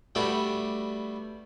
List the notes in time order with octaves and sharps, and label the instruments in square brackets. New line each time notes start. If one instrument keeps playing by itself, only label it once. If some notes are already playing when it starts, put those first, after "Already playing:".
[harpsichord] G3 A3 B3 D4 F#4 B5